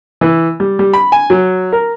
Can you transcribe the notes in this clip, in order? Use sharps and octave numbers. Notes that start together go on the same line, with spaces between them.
E3
G3
G3
B5
G#5
F#3
A#4